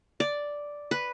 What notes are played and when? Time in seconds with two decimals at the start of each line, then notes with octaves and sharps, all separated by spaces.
0.20 D5
0.91 B4